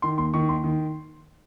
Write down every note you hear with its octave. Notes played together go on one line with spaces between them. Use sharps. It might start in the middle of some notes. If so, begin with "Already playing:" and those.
D#3 C6
D#2 C6
D#3 C#6
D#2 C6
D#3